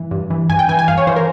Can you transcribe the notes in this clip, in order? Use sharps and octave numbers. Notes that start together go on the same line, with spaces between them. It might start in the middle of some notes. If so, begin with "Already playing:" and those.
Already playing: G2 E3
G2
E3
G2 G#5
G5
E3 G#5
G#5
G2 F5
C#5
E3 C5
A#4